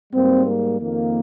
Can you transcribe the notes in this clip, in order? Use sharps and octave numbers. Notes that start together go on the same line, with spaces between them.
G#2 G3 A#3 C4
A#3
F2 D#3 A#3